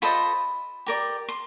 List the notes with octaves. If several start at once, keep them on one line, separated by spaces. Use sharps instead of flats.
F4 A4 C5 D#5 B5
G4 A#4 D5
C6